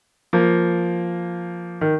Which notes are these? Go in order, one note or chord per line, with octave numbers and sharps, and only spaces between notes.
F3 A#3
D#3